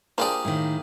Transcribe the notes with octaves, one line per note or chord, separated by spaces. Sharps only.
F3 A#3 D4 G4 G#4 D5
A2 D#3